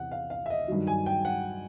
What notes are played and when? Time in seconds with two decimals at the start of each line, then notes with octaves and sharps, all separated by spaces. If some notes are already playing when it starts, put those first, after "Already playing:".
Already playing: E2 C3 F#5
0.11 F5
0.30 F5
0.46 E5
0.50 D#5
0.68 G2 D#3 F#3
0.87 G#5
1.06 G5
1.25 F#5